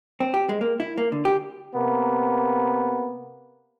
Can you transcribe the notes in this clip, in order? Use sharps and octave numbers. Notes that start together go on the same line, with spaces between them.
C4
G4
G#3
A#3
E4
A#3
D3
G4
C3 A#3 B3